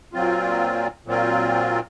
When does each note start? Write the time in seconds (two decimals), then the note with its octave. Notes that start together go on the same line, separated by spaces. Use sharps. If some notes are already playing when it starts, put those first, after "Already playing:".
0.13 A#2 F#3 C4 F4
1.06 A#2 F#3 C4 F4